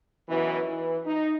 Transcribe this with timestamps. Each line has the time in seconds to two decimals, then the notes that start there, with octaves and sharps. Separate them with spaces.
0.29 F#2 B2 E3
0.67 E3
1.06 D#4